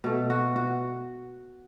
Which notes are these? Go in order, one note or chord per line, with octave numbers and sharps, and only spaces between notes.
B2 A3
F#4
F#4